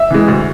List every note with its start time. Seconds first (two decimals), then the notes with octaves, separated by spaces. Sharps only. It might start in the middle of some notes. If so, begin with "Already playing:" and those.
Already playing: E5
0.11 E3 G#3
0.28 D2